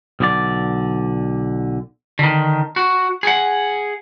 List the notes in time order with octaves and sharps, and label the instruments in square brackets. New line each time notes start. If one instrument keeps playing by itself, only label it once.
[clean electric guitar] B1 D3 D5
[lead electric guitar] D3 D#3
F#4
G#4 F#5